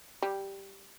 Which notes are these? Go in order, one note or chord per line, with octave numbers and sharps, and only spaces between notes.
G3